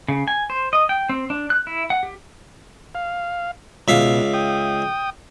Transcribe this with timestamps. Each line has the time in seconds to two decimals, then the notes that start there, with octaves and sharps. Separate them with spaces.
0.08 C#3
0.28 G#5
0.50 C5
0.73 D#5
0.89 G5
1.09 C4
1.30 D4
1.50 F#6
1.67 E4
1.90 F#5
2.03 G4
2.95 F5
3.88 C#2 B2 E5 F5
4.34 G5 D#6